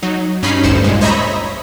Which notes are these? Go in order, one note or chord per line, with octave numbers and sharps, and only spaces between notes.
F#3 D#4
G2 C#4 D#4 B5 C7
A1 D2 G2 C5 C#7 E7
A#2 G#3
C5 C#5 D#5 E5 A#5 B5